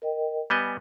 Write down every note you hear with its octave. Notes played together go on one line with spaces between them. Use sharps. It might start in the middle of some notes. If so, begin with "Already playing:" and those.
A#4 D#5 G5
G3 B3 D#5 G#5